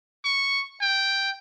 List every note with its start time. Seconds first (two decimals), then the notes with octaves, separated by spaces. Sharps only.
0.25 C#6
0.81 G5